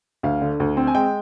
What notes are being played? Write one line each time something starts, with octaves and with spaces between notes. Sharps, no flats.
D2 F5
D3
D2
C4
G#5
G#3 G5